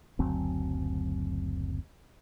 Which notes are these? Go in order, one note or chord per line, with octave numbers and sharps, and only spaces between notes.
F#1 D2 F#3 C4